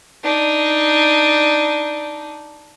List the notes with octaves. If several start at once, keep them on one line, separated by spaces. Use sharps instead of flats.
D4 D#4